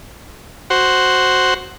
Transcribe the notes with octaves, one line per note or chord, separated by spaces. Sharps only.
F#4 C5